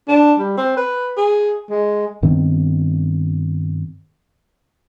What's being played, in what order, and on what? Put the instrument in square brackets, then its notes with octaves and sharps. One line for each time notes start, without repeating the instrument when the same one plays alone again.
[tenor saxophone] D4
G3
C4
B4
G#4
G#3
[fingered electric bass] G2 D#3 B3 C4